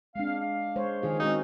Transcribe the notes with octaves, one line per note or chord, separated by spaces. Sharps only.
G#3 C4 D4 F5
F5
G#3 C5 C#5
D#3 F3 G#4 F5
G#3 C4 C#4 D#4 F#4 G#4 C5